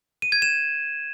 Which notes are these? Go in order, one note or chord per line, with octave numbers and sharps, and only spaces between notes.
D#7
G#6
E7